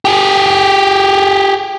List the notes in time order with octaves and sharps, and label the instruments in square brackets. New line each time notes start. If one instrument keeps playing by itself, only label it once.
[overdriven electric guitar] G4 G#4